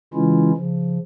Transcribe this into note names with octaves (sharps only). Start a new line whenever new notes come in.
C#3 E3 G#3 C#4 E4 F4
C#3 F3